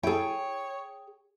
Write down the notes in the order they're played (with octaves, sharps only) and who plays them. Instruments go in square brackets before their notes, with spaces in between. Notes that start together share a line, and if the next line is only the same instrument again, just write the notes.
[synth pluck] E4 A4 [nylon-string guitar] G#4 G5 [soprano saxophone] C#5